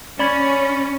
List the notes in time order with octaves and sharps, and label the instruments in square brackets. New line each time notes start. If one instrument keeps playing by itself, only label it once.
[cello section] C#4 [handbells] D5 B5 G#6